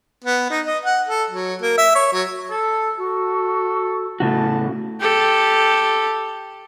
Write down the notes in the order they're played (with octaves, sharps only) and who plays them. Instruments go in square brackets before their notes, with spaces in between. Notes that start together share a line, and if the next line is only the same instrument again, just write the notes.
[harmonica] B3
D#4
D#5
F#5
A4
F#3
A#3
E5
C#5
F#3
[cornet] A4
[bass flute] F#4 [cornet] A4
[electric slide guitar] A2 C#3 F#4 [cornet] A5
[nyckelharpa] G4 A4